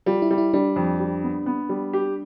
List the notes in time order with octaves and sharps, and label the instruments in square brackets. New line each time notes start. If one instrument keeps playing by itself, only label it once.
[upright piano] G3 [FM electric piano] F4
[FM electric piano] E4
[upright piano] G3
[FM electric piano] E4
[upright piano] G3 [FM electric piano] D4
[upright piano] F2
G3
B3
B3
G3
G4